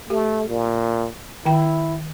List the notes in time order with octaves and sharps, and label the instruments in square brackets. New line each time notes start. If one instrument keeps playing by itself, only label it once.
[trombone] A3 [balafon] G4
[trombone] A#2
[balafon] D#3 G5 [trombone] E4